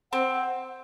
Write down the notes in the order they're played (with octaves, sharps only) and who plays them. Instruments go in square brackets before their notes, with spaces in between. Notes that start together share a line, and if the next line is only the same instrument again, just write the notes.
[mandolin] C4 [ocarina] F#5